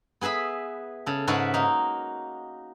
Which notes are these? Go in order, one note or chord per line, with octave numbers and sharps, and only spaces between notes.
B3 G#4 B4 E5 B5
C#3 A4
G#2 C#3 F#4 B4 E5 A5
A#3 D#4